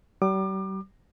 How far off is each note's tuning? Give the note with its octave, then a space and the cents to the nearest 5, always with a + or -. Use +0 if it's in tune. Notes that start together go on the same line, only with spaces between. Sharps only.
G3 -40 D6 +30